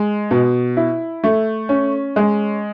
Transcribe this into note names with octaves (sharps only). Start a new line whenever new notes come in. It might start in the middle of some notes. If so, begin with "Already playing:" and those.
Already playing: G#3
B2
E4
A3
C#4
G#3